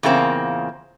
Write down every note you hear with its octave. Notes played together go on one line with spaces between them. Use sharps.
E2 A#2 C#3 A#3 C4